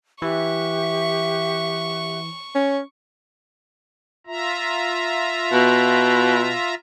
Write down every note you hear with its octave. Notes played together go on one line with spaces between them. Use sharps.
E3 G4 E5 F#5 C#6
C#4
F4 E5 A#5
B2